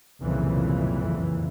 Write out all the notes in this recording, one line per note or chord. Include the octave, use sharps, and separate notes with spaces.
F#1 C2 F2 A#2 C#3 E3